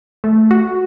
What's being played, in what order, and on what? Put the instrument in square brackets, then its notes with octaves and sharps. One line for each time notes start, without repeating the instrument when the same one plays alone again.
[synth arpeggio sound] A3
F#4